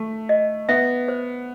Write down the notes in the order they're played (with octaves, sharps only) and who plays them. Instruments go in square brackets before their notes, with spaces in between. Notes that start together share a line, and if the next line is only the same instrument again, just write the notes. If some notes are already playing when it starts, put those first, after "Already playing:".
Already playing: [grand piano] A3 [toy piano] A5
[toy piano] D#5
[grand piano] B3 [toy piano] E5
[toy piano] C5